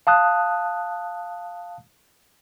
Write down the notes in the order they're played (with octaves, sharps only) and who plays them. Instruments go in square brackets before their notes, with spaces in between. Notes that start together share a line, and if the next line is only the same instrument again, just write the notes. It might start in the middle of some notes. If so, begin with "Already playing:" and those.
[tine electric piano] F5 A5 D#6 F#6